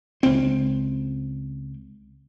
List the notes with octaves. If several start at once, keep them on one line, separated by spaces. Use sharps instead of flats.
C#2 C4